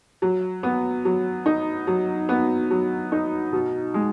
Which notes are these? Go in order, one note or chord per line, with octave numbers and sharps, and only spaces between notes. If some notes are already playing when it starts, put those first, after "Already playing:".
F#3
B3
F#3
D#4
F#3
B3
F#3
D#4
B2
G#3